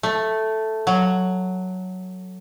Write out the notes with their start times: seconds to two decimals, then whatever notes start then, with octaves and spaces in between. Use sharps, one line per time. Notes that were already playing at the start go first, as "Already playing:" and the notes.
0.03 A3
0.87 F#3